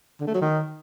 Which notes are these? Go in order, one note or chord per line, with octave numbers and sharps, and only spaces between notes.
D3
A3
F#3
D#3